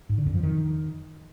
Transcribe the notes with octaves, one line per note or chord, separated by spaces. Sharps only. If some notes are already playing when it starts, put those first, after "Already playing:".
G#2
D3
F2
F3
D#3